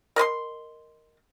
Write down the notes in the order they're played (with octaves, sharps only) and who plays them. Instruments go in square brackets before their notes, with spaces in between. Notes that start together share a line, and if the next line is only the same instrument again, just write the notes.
[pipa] A#4 D#5 B5 C6